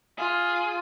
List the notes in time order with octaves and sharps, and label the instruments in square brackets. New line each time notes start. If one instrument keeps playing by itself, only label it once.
[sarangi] F4 [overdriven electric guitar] G#4